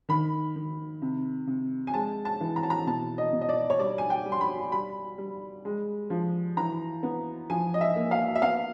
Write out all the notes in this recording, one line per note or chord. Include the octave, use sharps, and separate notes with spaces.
D#3 B5
D#3
C3
C3
G#5
G#3 A5
A5
E3
A#5
A5
A#5
B2 A5
D#5
B2
D#5
D5
C#5
G3 D5
G#5
G5
G3
C6
B5
G3 B5
G3
G#3
F3
E3 A#5
B3
F3 G#5
D#5
E5
A#3
F5
E5
B3 F5